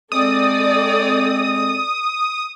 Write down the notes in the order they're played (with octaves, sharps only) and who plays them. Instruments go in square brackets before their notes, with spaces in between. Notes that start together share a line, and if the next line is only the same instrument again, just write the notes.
[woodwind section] G#3 C4 [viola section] A4 D5 [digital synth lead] D#6